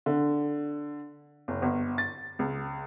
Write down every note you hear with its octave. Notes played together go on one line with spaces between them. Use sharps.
D3
F#1
G1
A6
C#2